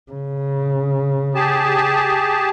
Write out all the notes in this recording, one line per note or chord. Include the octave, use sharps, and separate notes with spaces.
C#3
G4 G#4 A5